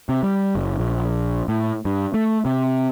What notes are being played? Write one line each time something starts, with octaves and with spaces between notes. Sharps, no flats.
C3
G3
F#1
A#1
A2
G2
A3
C3